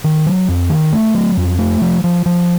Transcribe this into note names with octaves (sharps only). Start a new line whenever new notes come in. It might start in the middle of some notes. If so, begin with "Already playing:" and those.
D#3
F#3
F2
D#3
A3
F#3
F2
A3
F3
F3
F3